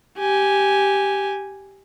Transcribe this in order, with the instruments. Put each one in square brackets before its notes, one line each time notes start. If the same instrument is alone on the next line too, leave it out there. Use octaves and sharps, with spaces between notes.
[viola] G4 G#5